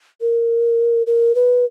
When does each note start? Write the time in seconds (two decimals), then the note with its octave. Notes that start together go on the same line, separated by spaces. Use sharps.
0.21 A#4
1.07 A#4
1.35 B4